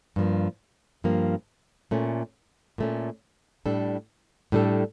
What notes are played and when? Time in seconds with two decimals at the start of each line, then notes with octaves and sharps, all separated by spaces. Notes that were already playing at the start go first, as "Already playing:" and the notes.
0.16 G2 F3 A#3
1.04 G2 F3 A#3
1.91 A#2 A3 C#4
2.78 A#2 A3 C#4
3.66 A2 G3 D4 A4
4.52 A2 G3 D4 A4